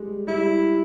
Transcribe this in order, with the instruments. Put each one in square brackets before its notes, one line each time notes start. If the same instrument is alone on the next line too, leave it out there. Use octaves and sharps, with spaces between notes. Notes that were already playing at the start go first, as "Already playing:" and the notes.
Already playing: [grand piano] G3 G#3
[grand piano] G3 [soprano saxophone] E4